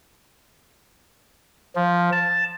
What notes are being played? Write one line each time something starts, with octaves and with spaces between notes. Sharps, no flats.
F3
A5